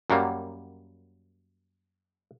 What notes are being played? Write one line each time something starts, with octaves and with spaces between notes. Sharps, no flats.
F#2 F#3 G3 A#3